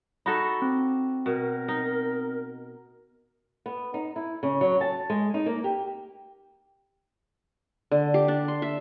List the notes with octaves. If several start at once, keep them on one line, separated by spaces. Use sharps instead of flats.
D#4 F#4 A4 B5 C#6
C4
B2 A#4
D#4
B3
D#4
E4
C#3
F#3
A5
G#3
D#4
A#3
G4
D3
G4
D4
C6
E5